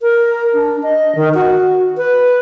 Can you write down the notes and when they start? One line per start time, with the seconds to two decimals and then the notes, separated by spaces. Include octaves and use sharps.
0.01 A#4
0.54 D4
0.83 D#5
1.15 D#3
1.34 F#4
1.97 B4